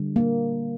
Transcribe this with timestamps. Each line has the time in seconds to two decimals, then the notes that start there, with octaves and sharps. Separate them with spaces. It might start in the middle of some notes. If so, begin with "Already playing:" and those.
Already playing: D3 G3
0.16 A#3